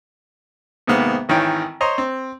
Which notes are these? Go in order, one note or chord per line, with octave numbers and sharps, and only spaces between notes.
G#2 C3 D#3 A#3 B3
G#1 D#3 E3 C#5 G5
C5 C#5 D#5 A#5
C4